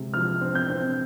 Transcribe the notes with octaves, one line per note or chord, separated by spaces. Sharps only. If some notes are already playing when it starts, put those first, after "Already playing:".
Already playing: C3 G#3
F3 F6
C4
G6
C4